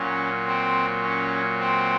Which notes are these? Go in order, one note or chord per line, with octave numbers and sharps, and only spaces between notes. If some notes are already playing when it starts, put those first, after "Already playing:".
Already playing: A#2 F#3 C#4
C4
C#4
C4